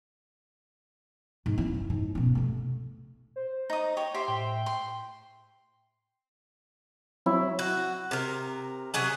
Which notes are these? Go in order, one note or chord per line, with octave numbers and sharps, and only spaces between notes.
G#2
C#4 E4
F#2
G#2
B2 C#4
C3 A3
C5
D#4 D#6
C#5 G5
G4 C5 E5 C6
A2 G5
C6
F#3 C4 E4 C#5
F#4
C3 A#4
C3 F#3 G#4 F#5